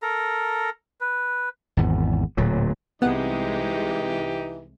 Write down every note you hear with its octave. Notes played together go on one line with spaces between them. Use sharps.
A4 A#4 A#5
B4
G#1 E2
D1 A#2 F#3
C2 C3 E3 G#3 B3 D#4 G4 F#5